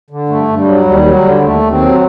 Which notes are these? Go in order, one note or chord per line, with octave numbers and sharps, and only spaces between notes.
D3
G2 A3
G2
G3
F#3
D#2 G3
F#3
G3
D3
D#2 A3
D#2
C4
F#3